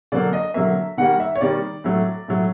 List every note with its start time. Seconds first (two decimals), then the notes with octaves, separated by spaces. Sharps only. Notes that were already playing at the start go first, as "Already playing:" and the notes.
0.12 D3 F#3 A#3 D5
0.33 D#5
0.54 D3 F#3 A#3 E5
0.97 D#3 G3 A#3 F#5
1.20 E5
1.35 C#5
1.41 D#3 G3 A#3 D5
1.84 A2 F#3 A3
2.28 A2 F#3 A3